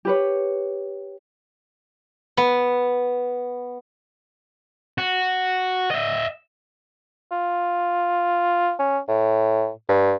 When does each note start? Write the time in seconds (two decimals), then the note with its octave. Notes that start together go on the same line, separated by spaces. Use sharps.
0.05 G4 B4 C#5
2.37 B3
4.98 F#4
5.91 D#5 E5
7.31 F4
8.79 C#4
9.08 A2
9.89 G2